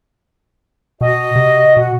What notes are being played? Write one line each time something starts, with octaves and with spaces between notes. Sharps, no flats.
B2 F#4 D#5
C3
B2 F#4